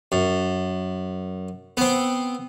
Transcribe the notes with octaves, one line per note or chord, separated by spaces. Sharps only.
F#2
B3 C4